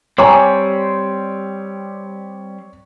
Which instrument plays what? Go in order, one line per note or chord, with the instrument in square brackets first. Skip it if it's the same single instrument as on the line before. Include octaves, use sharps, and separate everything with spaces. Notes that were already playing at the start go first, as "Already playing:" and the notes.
[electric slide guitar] G3 C4 [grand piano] C#5 [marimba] G#5 A#5 D6